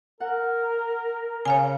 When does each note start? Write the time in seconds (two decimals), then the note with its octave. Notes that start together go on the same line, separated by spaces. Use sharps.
0.20 A#4 F#5
1.45 C#3 C#5 F5 G#5